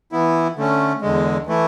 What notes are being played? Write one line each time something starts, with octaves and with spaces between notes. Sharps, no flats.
E3 B3 E4
D3 A3 C#4
E2 D3 G#3
E3 A3 E4